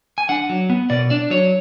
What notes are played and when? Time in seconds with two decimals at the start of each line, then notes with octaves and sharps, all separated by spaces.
0.18 G#5
0.29 D4 F#5
0.49 F#3
0.70 B3
0.90 B2 D5
1.10 D4 D5
1.30 F#3 C#5